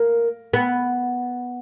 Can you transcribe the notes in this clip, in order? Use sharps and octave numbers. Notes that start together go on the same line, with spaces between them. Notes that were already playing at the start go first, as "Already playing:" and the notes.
Already playing: A#3
B3